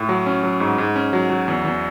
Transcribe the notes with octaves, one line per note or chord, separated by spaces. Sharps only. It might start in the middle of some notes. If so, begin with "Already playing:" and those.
Already playing: A2
F#3
C#4
F#3
G#2
G#2
C#4
F#3
F#3
E2
E2